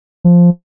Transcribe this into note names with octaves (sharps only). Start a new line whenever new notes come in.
F3